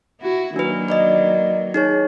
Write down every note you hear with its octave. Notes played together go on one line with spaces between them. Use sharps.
E4 F#4
D#3 F#3 A#3 D4 B4
B4 D5 D#5
D#4 G#4 C#5